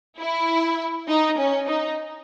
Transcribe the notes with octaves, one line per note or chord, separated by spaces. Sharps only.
E4
D#4
C#4
D#4